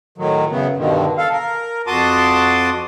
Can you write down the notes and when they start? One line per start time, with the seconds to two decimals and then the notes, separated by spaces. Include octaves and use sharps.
0.18 A2 D#3 F#3
0.51 F#2 C#3 B3
0.77 G2 B2 D3 D#3
1.18 A4 F5
1.32 A#4
1.87 F2 F#4 A5 C6 D6 D#6